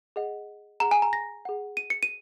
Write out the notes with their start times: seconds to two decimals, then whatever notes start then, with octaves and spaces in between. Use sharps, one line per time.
0.16 G#4 D#5 F#5
0.80 G#4 F#5 A#5
0.91 G#5
1.02 A#5
1.13 A#6
1.45 G#4 F#5
1.77 D#7
1.90 C#7
2.03 D#7